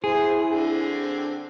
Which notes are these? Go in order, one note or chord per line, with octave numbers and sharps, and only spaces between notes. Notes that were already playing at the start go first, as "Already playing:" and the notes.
E4 G#4 C5
D3 C4